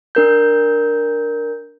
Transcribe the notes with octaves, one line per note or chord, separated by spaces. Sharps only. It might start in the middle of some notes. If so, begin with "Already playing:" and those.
D4 A#4 G6